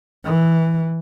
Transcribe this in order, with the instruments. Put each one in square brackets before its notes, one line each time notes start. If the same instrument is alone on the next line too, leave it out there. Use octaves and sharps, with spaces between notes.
[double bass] E3